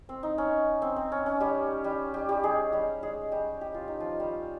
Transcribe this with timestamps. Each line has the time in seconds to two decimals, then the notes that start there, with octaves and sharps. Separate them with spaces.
0.09 C4
0.23 D#4
0.38 C#4
0.82 C4
0.96 C4
1.12 C#4
1.26 C#4
1.40 G3 G4
1.84 G3 G4
2.14 G3 G4
2.29 G3 G4
2.44 G#3 G#4
2.72 G3 G4
3.03 G#3 G#4
3.32 G3 G4
3.61 G4
3.75 F4
3.88 D#4
4.00 F3 F4
4.20 G3 G4